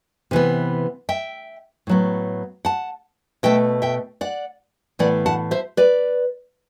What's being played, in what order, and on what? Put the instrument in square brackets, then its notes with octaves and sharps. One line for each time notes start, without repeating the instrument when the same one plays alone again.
[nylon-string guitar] C3 E3 B3
E5 G5
A2 F#3 B3
F#5 A5
B2 A3 E5 G5
E5 G5
D5 F#5
A2 E3 B3 D5 F#5
F#5 A5
C5 E5
B4 D5